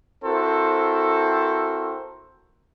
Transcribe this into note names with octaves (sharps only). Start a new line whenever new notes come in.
C4 E4 F#4 A4 A#4 C5